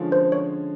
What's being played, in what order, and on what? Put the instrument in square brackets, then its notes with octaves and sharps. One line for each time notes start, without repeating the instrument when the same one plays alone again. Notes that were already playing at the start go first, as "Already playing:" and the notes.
Already playing: [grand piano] D3 F3 G#3 C#4 F4
[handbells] C5
C#5